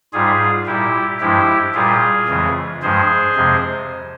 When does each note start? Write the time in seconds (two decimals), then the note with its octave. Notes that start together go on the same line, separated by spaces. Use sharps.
0.13 G#2 G3 F4 G#4
0.66 A#2 G3 E4 G4
1.20 G2 F3 G#3 E4 G4
1.74 A#2 G3 F4 G#4
2.28 F2 C#3 E3 G#3
2.82 G2 F3 G#3 G#4 C5
3.36 F2 C3 F3 G#3